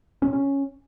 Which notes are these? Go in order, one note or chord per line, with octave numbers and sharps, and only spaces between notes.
C#4
C3
C#4